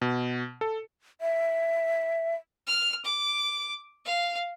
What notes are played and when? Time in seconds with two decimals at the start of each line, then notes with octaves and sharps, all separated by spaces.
0.01 B2
0.61 A4
1.21 E5
2.67 F6
3.05 D6
4.05 F5